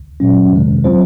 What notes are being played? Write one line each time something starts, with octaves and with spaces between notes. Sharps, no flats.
A#2 F#3 C#4
F2 C3 D#3 G#3
F#3 C4 F4 C5